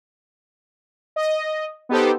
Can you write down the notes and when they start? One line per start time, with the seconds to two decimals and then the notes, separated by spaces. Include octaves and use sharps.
1.16 D#5
1.89 B3 D#4 G4 A4 C5